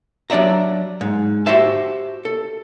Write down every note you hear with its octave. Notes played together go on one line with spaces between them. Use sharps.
F#3 D4 D5 E5 A#5
G#2
F#4 G4 C5 E5 A5
A4